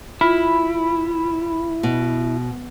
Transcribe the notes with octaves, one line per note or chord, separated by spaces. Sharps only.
E4 F4 B5
B2